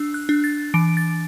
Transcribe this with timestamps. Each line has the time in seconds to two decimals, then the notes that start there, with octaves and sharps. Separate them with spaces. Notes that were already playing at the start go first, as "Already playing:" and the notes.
Already playing: D4 E6
0.14 F#6
0.29 D4
0.44 A6
0.74 E3 D7
0.97 A6